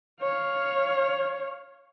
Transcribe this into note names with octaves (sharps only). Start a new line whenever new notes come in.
C#5 F5